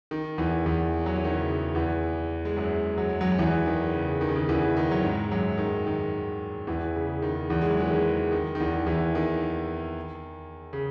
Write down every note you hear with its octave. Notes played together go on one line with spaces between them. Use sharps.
D#3
E2 E3
E2 E3
F#3
E3
D#3
C#3
E2 E3
G#3
F#2 F#3
F#3
G#3
F#2 F#3
F#3
E2 E3
D#3
C#3
D#3
C#3
D#3
E2 E3
D#3
F#3
G#2 G#3
F#2 F#3
D#3
D#3
E2 E3
C#3
D#3
E2 E3
G#3
F#3
E3
D#3
D#3
D#3
E2 E3
E2 E3
D#3
C#3